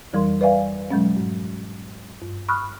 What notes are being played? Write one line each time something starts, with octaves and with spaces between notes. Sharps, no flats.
F2 E3 G3 A#4 C6
B4 D5 E5 F5 G#5
B2 F#3 G#3 C#4
G#2
G2
B5 C#6 D#6 F6 F#6